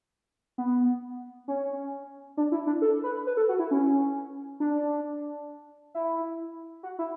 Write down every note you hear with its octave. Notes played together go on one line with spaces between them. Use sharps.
B3
C#4
D4
E4
D4
A4
B4
B4
A4
F#4
E4
C#4
D4
E4
F#4
E4